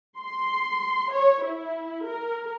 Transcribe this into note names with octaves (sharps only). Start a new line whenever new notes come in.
C6
C#5
E4
A#4